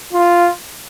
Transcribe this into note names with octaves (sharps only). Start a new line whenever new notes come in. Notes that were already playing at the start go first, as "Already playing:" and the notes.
F4